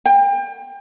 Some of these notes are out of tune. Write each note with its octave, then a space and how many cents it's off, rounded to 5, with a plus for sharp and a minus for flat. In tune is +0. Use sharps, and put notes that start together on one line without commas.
G5 +30